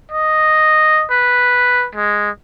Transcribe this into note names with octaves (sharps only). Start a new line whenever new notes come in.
D#5
B4
G#3